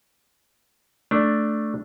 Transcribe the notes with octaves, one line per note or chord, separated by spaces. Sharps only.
A3 D4